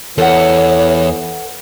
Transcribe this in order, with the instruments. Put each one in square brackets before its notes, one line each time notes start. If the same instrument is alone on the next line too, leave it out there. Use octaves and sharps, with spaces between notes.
[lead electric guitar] E2 [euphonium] E3 [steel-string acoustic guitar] A4 F#5 [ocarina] C#5